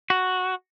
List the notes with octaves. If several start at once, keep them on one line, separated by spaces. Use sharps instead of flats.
F#4